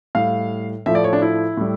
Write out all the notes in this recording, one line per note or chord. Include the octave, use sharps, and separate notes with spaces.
A2 G3 F5
A2 F3 A3 E5
D5
C#5
D4
E4
A2 G3